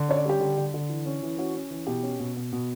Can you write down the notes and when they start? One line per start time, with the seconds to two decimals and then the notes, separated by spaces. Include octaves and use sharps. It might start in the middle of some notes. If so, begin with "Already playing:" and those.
Already playing: D3
0.09 C#4 C#5
0.17 D5
0.25 G3 G4
0.40 D3
0.58 D3
0.74 D3
0.89 E3
1.06 C#4
1.23 E3
1.38 C#4 F#4
1.55 C#4
1.70 E3
1.87 B2 G4
2.03 C#4
2.20 B2
2.37 B2
2.53 B2